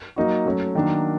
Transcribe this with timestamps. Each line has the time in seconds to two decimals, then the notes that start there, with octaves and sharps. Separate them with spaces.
0.16 F#3 A#3 D#4 F#4
0.46 F#3 A3 C#4
0.75 D#3 F#3 A#3 D4